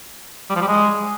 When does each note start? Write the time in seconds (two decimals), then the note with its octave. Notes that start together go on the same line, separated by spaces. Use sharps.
0.50 G3
0.56 F3
0.62 G3
0.68 G#3